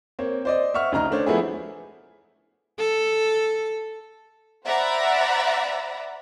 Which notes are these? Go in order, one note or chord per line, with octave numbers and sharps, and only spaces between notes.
A#3 C4 C#5
C5 D5 D#5
E5 F#5 C#6 F6
D2 C#3 D#4 A#5 F6
A3 D4 C5 C#5
F3 A3 B3 E4 G#4
A4
C5 D5 E5 F#5 A#5 B5